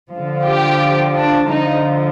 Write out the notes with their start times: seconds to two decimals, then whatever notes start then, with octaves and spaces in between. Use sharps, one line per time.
0.11 F3
0.16 D3
0.45 G4
1.15 D4
1.49 D3 F3 D#4